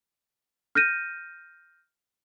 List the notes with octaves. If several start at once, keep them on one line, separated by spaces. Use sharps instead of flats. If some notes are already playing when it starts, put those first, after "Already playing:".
F6 G6 A#6 D#7